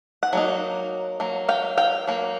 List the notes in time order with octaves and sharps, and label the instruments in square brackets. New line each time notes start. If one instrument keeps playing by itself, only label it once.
[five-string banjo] F#5
F#3 A#3 D#4
F#3 A#3
F5 G5
F5 G5
F#3 A#3